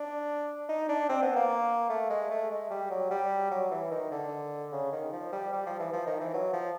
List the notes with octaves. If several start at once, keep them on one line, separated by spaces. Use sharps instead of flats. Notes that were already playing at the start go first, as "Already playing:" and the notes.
Already playing: D4
D#4
D4
C4
B3
A#3
A3
G#3
A3
G#3
G3
F#3
G3
F#3
E3
D#3
D3
C#3
D#3
F3
G3
G3
F3
E3
F3
D#3
E3
F#3
F3